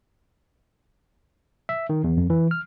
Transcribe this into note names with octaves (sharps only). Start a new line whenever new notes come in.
E5
D#3
E2
F2
E3
F6